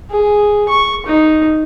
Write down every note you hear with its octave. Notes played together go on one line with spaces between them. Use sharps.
G#4
C#6
D#4